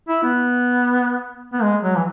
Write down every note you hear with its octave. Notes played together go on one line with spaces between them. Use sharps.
E4
B3
B3
G#3
F#3
E3